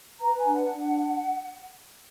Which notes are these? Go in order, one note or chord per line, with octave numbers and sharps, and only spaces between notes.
B4 A#5
G#5
D4
F#5
D4